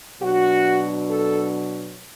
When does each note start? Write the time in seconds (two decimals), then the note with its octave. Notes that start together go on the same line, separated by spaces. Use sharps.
0.21 B2 F#3 D4 F#4
1.09 A4